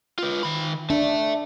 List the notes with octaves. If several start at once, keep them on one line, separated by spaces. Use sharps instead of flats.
F4 B4
D#3 B5
D4 E5 A5